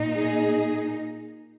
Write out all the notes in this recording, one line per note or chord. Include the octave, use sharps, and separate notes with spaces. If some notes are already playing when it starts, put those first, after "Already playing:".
Already playing: A#2 A#3 D#4
G#4